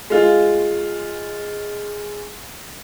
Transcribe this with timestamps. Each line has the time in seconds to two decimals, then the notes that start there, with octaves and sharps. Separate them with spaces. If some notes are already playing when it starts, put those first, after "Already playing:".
0.10 G#3 F4